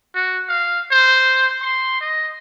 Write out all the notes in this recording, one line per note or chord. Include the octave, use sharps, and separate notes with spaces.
F#4
F5
C5
C6
D#5